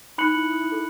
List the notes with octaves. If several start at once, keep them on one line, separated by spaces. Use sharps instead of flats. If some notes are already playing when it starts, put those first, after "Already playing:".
D#4 B5 F#6 C#7 F#7
E4
E4
E4
A4